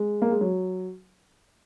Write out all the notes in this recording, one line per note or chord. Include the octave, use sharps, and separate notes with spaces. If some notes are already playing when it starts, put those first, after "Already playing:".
Already playing: G#3
A#3
G#3
F#3